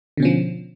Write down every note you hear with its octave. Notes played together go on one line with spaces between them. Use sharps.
B2 D3 F3 C#4